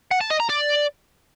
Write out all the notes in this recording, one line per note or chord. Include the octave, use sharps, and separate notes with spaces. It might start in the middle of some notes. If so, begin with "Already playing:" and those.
F#5
A5
D#5
A#5
D5